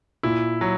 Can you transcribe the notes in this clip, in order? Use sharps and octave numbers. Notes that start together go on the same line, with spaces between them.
A#2 E4
F#3